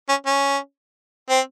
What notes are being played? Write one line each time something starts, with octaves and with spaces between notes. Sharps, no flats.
C#4
C#4
C4